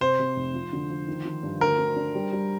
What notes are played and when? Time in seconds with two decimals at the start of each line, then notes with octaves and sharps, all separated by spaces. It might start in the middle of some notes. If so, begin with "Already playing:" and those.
0.01 C3 C5
0.19 C3
0.36 F1
0.54 F3
0.73 D3
0.90 F3
1.08 D#3
1.25 D#3
1.43 G2
1.61 D2 A#4
1.78 D3
1.96 D4
2.15 G3
2.32 G3